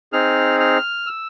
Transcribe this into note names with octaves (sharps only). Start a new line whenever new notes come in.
C4 D#4 G#4 F6
F6
E6